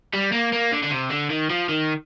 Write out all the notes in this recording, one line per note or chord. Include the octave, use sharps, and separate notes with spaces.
G3
A#3
A#3
D3
D3
C3
D3
D#3
F3
D#3